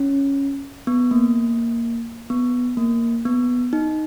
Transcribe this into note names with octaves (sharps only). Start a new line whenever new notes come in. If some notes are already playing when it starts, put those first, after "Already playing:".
Already playing: C#4
B3
A#3
B3
A#3
B3
D#4